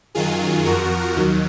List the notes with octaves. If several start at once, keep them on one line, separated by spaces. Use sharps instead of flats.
F#2 D#3 F#3 F4 G#4
F2 F3 F#4 A#4
D#2 D#3 F#3